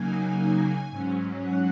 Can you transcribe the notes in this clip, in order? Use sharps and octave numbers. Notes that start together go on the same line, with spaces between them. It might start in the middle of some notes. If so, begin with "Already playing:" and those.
Already playing: C#3 F#3 A#3 D#4 G#5
G#2 F#3 C#4
F#5